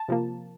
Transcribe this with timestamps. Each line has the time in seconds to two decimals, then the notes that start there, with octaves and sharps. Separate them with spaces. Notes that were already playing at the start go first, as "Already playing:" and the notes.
Already playing: A5
0.08 C3 F3 A#3